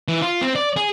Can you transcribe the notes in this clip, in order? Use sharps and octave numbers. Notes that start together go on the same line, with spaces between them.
E3
F4
C4
D5
G#4